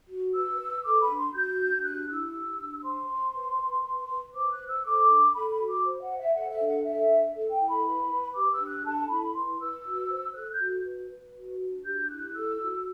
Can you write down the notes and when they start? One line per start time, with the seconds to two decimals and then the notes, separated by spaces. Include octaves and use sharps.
0.08 F#4
0.34 B4 E6
0.59 B4
0.84 A4 D6
1.00 B5
1.09 D4
1.17 C6
1.33 F#4 G6
1.59 D4
1.84 G4 F#6
2.08 E4 E6
2.34 G4
2.59 D4
2.84 C5 C6
3.09 C5
3.34 B4
3.59 B4
3.84 B4
4.09 B4
4.33 C5 D6
4.50 F#6
4.59 C5
4.67 E6
4.84 A4 D6
5.09 D4
5.34 A4 B5
5.51 B5
5.59 F#4
5.67 D6
5.84 C5
6.01 F#5
6.09 C5
6.18 E5
6.34 A4 F#5
6.51 E5
6.59 D4
6.68 F#5
6.84 A4 E5
7.10 D4
7.34 A4
7.51 G5
7.59 E4
7.68 B5
7.84 B4
8.09 B4
8.34 G4 D6
8.51 E6
8.59 D4
8.67 F#6
8.84 A4 A5
9.09 E4 B5
9.34 B4 C6
9.59 B4 E6
9.84 F#4
10.09 C5
10.34 A4 F#6
10.51 G6
10.59 F#4
10.85 B4
11.10 B4
11.35 F#4
11.60 D4
11.84 G4 G6
12.09 E4 F#6
12.35 A4 E6
12.60 F#4